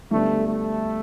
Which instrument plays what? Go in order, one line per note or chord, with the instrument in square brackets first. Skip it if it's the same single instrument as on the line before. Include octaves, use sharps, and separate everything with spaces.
[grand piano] D2 D3 G3 B3 D4 [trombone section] A3
[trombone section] A3